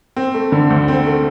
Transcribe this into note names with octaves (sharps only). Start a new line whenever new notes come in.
C4
A3
D3
D2
C4
A3